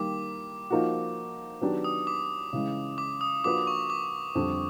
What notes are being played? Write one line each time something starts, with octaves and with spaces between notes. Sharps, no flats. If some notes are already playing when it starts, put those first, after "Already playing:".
Already playing: D#3 G3 A#3 D6
F3 A#3 D#4 F#4
D#3 F#3 B3 D4 G4
D#6
D6
C#3 E3 G#3
D6
D#6
F3 A#3 D4 F#4 B4 D6
C#6
D6
F2 D3 G3